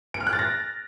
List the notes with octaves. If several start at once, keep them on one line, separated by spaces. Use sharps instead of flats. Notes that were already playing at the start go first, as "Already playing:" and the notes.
D7
F6
F#6
A6
A#6